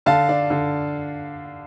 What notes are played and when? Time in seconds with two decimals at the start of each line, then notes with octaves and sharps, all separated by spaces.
0.06 D3 F5 A5
0.29 D4
0.50 D3